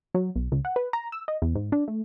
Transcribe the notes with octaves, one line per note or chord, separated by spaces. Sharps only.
F#3
B1
C#2
F#5
B4
A#5
E6
D#5
E2
G#2
D4
A3